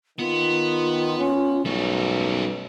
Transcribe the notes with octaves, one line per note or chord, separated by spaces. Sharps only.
D#3 B3 F4
C#4
B1 F#2 G3 A3 F#4